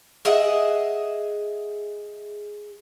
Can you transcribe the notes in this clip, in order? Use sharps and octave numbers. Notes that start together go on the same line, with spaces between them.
G#4 D#5 E5 F#5